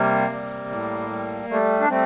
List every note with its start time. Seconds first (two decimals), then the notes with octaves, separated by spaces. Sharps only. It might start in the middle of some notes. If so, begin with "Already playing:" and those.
Already playing: C3 G3 A#3
0.31 G3
0.70 A2
1.10 G3
1.50 G3 A3
1.80 D4
1.89 G3 A3 C4